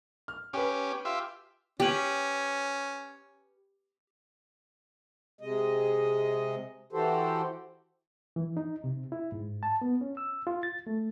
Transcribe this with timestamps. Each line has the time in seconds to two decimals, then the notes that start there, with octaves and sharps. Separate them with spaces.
0.28 F6
0.53 C#4 G4 B4 G#5
1.05 F4 G4 E5
1.80 C#4 G4 B4
5.41 C3 G#3 D#5
6.93 E3 F#4 G4 A4 C5
8.36 E3
8.57 D#4
8.84 C3
9.12 E4
9.32 G#2
9.63 A5
9.82 B3
10.01 C#4
10.17 E6
10.47 F4
10.63 A6
10.87 A3